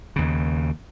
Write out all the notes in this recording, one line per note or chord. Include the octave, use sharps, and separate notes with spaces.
D#2 C#3